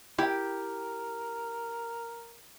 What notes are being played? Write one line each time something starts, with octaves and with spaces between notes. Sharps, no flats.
E4 G4 A#4 G5